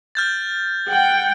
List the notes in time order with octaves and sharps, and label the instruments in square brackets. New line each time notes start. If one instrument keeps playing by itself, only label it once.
[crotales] F6 G6 A6
[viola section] F#5 G5